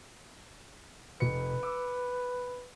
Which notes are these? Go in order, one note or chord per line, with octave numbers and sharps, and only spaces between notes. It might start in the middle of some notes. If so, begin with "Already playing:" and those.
F1 B4 C#7
D6 E6